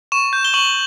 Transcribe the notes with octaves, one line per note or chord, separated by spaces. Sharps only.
C#6 E7
G6
G7
C#6 F#7